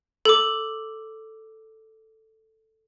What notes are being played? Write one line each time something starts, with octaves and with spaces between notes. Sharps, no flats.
A4 D6